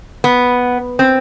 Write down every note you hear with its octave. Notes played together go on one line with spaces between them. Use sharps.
B3
C4